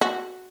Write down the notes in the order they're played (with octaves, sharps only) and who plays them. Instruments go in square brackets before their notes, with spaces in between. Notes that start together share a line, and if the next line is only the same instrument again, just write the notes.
[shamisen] F#4